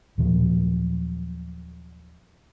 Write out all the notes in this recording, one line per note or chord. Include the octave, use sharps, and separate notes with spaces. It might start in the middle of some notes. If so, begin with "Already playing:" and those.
D#2 A#2 F3 F#3